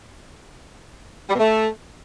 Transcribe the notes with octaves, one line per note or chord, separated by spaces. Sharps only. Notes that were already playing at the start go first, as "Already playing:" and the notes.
G3
B2
A3